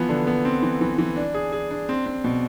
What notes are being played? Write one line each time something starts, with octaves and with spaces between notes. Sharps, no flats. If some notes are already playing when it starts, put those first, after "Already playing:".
Already playing: E3 F3 B3
D3
B3
C4
E3
E3
E3
D4
G#4
G#4
D4
C4
C4
B2